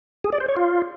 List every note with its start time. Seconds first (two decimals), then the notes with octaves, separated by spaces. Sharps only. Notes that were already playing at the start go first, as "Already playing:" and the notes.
0.24 G#4
0.32 D5
0.40 C5
0.48 C#5
0.56 F4